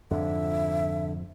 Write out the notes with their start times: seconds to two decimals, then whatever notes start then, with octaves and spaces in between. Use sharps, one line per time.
0.11 F2 G#2 D3 F3 E5